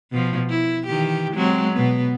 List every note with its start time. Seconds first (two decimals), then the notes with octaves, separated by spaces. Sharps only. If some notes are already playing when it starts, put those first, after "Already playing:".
0.11 B2 F3
0.50 E4
0.87 D#3 E3 G4
1.34 F#3 G#3 C4
1.73 B2 B3